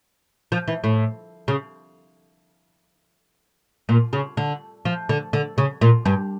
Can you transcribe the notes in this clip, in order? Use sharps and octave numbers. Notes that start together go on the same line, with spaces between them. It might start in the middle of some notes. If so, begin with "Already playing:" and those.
F3
E3
A2
C#3
A#2
C#3
D3
F3
D3
D3
C#3
A#2
G2